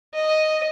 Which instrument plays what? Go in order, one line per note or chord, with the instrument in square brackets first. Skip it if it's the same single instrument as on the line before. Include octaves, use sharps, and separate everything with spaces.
[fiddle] D#5